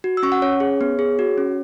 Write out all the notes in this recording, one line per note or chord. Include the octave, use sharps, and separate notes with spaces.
F#4
E6
C#4 C#6
F#5
C#4 C#5
G#4
B3
G#4
F#4
C#4